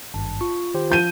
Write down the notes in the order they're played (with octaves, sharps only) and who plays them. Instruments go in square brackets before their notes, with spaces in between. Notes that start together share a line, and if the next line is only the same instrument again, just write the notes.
[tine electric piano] G#1 G2 [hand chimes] A5
[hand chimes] F4 [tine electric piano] C#6
[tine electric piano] D#3 G4 C5
[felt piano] F3 G6 D#7